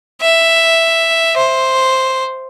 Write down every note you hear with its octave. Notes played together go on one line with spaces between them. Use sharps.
E5
C5